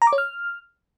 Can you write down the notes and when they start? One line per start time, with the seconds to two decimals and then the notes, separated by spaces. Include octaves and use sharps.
0.02 A#5
0.07 D6
0.13 C#5
0.18 F6